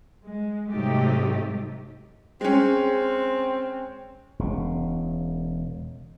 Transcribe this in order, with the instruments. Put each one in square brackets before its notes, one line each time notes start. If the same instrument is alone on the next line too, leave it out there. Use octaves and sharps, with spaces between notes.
[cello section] G#3
G#2 C3 F#3 A3 D#4 G4
[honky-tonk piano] G#3 C#4 [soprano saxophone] C4
[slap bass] E1 C#3